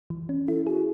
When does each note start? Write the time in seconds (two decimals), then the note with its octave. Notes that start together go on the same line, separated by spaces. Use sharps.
0.10 E3
0.29 C#4
0.48 E4 A4
0.67 F#4 G#4